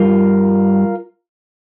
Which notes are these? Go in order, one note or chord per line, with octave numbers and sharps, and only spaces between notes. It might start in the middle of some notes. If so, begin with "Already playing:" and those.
Already playing: G2 G3 F4 A#4